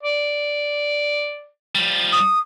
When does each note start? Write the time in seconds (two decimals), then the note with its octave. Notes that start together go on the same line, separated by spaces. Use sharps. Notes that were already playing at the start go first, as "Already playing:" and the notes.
0.03 D5
1.75 F3 G3
2.12 D#6